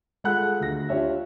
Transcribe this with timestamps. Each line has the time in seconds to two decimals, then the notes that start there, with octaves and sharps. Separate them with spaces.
0.24 G#3 F4 A4 F#5 B5 F#6
0.60 D2 A#6
0.89 D4 F4 G4 C#5 E5